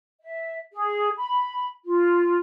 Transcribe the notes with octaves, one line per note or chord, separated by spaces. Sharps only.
E5
G#4
B5
F4